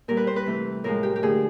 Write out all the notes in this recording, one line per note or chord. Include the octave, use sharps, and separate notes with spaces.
A#2 G3 A#4
B4
C5
B4
C3 E3 A3
A2 F3 G#3 A#4
G4
G4
D3 F3 A3 G#4